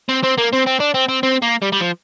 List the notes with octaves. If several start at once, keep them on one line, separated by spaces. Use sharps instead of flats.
C4
C4
A#3
C4
C4
D4
C4
C4
C4
A#3
G3
G3
F3